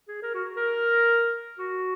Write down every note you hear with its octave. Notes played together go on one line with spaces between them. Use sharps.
G#4
A#4
F#4
A#4
F#4